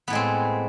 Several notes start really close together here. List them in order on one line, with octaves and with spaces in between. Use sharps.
B3 A2 G#3 C4